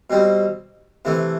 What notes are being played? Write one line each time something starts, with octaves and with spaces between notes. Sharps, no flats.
B2 G3 C4
C3 E3 A3